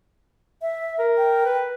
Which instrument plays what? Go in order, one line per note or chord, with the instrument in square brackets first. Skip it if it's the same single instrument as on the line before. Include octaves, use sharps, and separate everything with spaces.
[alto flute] E5
[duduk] A#4
[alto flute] G5
[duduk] B4